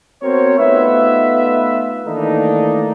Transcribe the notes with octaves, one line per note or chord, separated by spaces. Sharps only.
B3 C4 F#4 A#4 C5 C#5
A3 B3 D#4 F4 B4 E5
D#3 E3 A3 A#3 D4 D#4